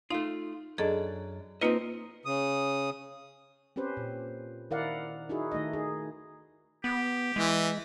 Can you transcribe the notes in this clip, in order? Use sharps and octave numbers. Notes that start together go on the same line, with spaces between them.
A3 D#4 F4
F#2 D4 G#4 A4 D#5
A#3 C4 D#4 F4 B4 D#5
C#3 D#6
C4 C#4 G4 B4 C5
A#2
D#3 E4 A#4 D5 F5 F#5
D#4 E4 F#4 G#4
D#3 A3 D#4 D#5
D#4 G#4
B3 G4
E3 G#3